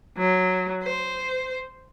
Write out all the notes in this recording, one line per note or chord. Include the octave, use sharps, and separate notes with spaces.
F#3
C5